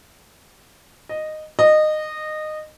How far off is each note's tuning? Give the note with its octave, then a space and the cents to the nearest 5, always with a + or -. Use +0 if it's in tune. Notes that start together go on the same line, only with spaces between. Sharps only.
D#5 -10
D#5 -20